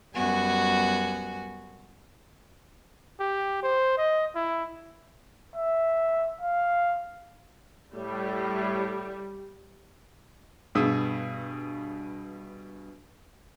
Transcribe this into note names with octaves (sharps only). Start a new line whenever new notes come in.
F#2 G3 B3 F#4 G#5
G4
C5
D#5
E4
E5
F5
A2 G3 G4
G2 B2 G#4 D#6 E6